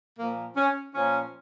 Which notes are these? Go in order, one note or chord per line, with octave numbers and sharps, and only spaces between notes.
A#2 F3 A#3
C#4
A#2 F3 C#4